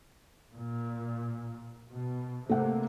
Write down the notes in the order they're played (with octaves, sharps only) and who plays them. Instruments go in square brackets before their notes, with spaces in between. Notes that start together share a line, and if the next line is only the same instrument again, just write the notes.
[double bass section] A#2
B2
[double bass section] C3 A#3 [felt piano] A3 F#5